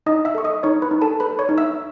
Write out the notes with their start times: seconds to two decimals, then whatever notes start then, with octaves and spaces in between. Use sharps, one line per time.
0.06 D#4 D#5 D#6
0.25 E5 E6
0.35 A4 C#6
0.44 D#5 D#6
0.63 D#4 C#5 C#6
0.82 B4 B5
0.91 D#4
1.02 A4 A5
1.20 A4 B4 B5
1.39 C#5 C#6
1.49 D#4
1.58 E5 E6